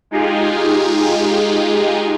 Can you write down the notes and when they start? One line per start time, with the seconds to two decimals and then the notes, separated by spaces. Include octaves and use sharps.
0.11 G#3 D#4 F4 G4 G#4